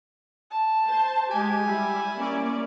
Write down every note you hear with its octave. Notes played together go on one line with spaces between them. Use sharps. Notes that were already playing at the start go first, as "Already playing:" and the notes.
A5
C5
G#3 G4 G#5
G3 E4
A#3 C#4 D5